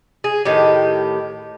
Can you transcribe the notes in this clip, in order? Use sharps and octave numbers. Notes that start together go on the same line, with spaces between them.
G#4
A2 D#3 G4